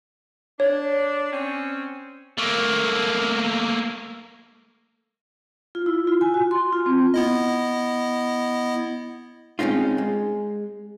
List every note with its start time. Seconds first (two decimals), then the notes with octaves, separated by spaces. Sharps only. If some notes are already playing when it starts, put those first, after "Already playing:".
0.60 D4 C#5
1.33 C4 C#4
2.38 A3 A#3
5.75 F4
5.86 E4
6.07 F4
6.21 G#5
6.34 F#4
6.51 C6
6.72 F4
6.86 C4
7.14 B3 E4 D#5
9.59 G#3 C4 C#4 D#4 F4
9.98 G#3